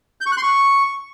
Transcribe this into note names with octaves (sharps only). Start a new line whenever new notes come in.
G6
C#6
F#6
C6
C#6